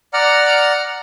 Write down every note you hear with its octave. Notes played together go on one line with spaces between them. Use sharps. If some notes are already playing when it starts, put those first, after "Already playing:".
D5 F#5 A#5 F6